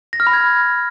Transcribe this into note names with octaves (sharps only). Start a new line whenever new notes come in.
A#6
F6
B5
G#6